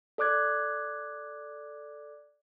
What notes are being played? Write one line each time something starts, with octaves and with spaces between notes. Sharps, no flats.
A4 D5 D6 F#6 G#6